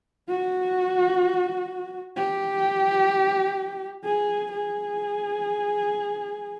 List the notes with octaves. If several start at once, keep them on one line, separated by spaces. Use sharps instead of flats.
F#4
G4
G#4
G#4